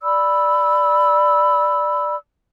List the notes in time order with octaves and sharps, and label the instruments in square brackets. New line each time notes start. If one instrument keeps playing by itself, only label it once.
[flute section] D5 B5 E6